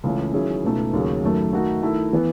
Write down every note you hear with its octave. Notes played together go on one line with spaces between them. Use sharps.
C#2 C#3 E3 A3 C#4
D#3 F#3 C#4 E4 G#4
C#2 B2 A3 D#4
D#2 C#3 F#3 C#4 G#4
F#2 D#3 F#3 A3
D#3 A3 D#4 F#4
D#3 A3 E4
E3 B3